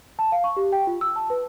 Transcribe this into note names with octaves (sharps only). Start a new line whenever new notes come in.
A5
F5
C#6
G4
G5
F4
E6
A5
B4